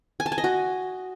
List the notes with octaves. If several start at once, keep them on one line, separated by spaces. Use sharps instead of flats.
G#5
A5
G#5
D#5
F#4